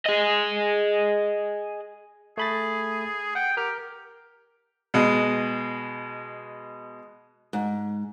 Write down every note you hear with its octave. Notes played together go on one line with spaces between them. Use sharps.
G#4 D#5
A3 G#4 B5 A6
F#5 G5
G4 A#4 F6
B2 G#3
G#2